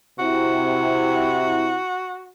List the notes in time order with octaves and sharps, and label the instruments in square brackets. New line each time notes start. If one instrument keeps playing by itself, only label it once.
[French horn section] C3 E4 [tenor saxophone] F#4